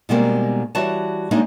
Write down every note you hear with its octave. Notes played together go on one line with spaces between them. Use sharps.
B2 D#3 G3 G#3 A#3 C4
E3 G3 F#4 C#5 A5
G3 G#3 A#3 D4 D#4 C#5